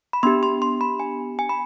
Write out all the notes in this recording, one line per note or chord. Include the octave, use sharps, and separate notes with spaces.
B5
B3 D4 G4 C6
C6
C6
B5
G#5
G#5
B5